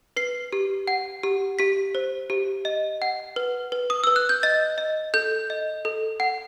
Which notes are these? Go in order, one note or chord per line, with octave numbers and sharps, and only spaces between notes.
B4 C7
G4
F#5
G4
G4 B6
C5
G4
D#5
F#5
B4
B4
D#6
B4 E6
F#6
G6
D#5 A6
D#5
A4 G6
D#5
A4
F#5